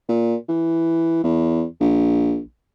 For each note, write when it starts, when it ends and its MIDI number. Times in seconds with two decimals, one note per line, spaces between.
0.09 0.35 46
0.48 1.20 52
1.23 1.64 40
1.80 2.39 34